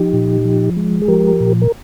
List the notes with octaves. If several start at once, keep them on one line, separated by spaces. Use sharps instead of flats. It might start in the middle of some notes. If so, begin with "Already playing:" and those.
Already playing: F3 D#4 G4
A#2
F3
G#3
G#4
F3 G4 A#4
A#2
A#4